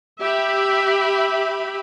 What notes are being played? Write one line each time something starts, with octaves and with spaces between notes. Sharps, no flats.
G4 E5 B5